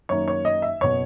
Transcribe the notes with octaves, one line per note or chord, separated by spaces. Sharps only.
F#2 D#3 A#3 C#5
C#5
D#5
E5
F#1 B2 C#5